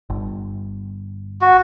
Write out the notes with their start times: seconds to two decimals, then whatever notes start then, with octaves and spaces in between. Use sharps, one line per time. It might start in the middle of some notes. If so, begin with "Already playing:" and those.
0.10 G1
1.41 F#4